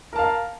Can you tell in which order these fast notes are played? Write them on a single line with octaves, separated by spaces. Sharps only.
A#4 A5 F5